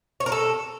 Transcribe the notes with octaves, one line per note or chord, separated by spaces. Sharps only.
C#5
A#4
A4